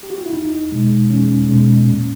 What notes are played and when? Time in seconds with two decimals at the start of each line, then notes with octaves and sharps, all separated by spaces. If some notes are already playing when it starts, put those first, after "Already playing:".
0.03 G4
0.10 F#4
0.18 F4
0.26 E4
0.33 E2 D#4
0.72 B2 G#3
1.10 E2 C#4
1.49 B2 G#3
1.87 A#2